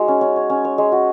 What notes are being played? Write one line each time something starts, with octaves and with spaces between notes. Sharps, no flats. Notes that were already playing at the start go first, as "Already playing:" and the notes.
Already playing: G#3 D#4 F#4
C#4
C#4
C#5
C#4
C#5
G#3
F#4